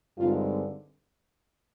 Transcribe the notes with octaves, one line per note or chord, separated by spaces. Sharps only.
G2 D3 G#3 C4 D#4 F4